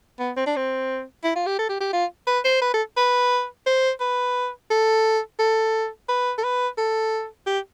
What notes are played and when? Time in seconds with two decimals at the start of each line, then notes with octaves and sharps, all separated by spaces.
0.19 B3
0.37 C4
0.46 D4
0.56 C4
1.24 E4
1.35 F4
1.47 G4
1.59 A4
1.69 G4
1.81 G4
1.93 F4
2.27 B4
2.45 C5
2.61 B4
2.74 A4
2.97 B4
3.66 C5
4.00 B4
4.71 A4
5.39 A4
6.09 B4
6.38 A4
6.44 B4
6.78 A4
7.47 G4